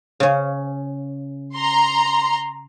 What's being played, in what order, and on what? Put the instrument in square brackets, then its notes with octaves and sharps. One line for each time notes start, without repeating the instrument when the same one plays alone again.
[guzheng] C#3 C#4
[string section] A#5 C6